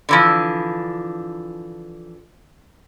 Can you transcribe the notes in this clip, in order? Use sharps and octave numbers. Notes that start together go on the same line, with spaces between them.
D3 E3 F3